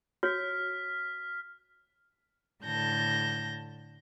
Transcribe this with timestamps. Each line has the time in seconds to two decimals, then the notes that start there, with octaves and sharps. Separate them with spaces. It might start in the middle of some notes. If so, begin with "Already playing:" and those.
0.23 F#4 C#5 F6 B6
2.64 A2 D3 A5 G6 A#6